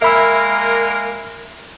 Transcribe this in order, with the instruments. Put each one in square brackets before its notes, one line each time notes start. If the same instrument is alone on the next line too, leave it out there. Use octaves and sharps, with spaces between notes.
[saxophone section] G#3 A#3 A#4 [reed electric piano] E5 B5 E6